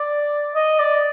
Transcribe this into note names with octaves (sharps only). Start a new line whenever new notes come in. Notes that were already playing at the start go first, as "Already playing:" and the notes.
Already playing: D5
D#5
D5